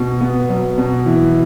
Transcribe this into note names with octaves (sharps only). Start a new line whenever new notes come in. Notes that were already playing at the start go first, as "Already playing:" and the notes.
Already playing: B2
B3
F#3
B2
E3